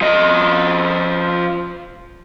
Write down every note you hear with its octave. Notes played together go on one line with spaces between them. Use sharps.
F3 D#5